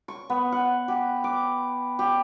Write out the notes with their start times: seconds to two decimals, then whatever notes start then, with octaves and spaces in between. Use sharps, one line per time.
0.08 C#6
0.30 B3
0.52 F#5
0.88 G4
1.24 D6
1.99 G4